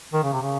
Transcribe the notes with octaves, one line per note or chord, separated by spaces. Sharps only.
D#3
C#3
C3
C#3